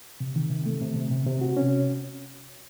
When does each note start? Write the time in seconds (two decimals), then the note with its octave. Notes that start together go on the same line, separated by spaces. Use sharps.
0.20 C3
0.36 D#3
0.51 C3
0.66 A3
0.81 C3
0.96 C3
1.11 C3
1.26 C3
1.41 F#4
1.57 C#4